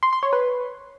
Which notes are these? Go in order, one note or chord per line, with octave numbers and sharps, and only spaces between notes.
C6
C6
C#5
B4